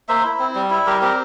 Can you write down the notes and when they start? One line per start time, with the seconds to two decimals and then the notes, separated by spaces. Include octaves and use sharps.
0.09 A#3 C5 E5
0.25 E4
0.39 C4
0.55 G3
0.70 E4
0.86 G3 G4 A#4
1.01 C4 G4 A#4